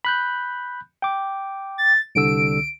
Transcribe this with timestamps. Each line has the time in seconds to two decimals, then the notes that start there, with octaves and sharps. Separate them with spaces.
0.05 B5 F#6 G6
1.02 G5 D6
1.78 A6
2.15 C2 D3 E6 D7